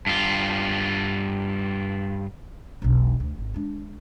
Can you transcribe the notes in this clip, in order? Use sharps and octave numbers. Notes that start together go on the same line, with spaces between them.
G2 F4
E1 B1
D2
G#1
G#3 D4